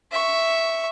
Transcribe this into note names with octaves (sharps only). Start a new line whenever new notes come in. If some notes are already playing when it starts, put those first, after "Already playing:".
E5 C#6